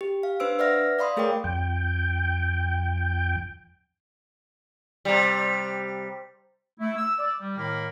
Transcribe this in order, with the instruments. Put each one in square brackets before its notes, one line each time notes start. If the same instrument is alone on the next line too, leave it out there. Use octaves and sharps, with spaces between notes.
[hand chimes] G4
F5
D4 B4 C5 E6 D7
B4 D5 E5 F#5 F6 A#6
D5 F5 B5 C6 D#6
A3 G#4 A#4 C#5 G5 D6
[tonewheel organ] F2 G5
[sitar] C3 G3
[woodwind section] A3 E4
E6
D5
G3
A2 D#3 G#3 A#3 B5 F6